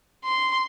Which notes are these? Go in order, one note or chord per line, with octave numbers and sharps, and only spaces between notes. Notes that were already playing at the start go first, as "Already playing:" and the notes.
C6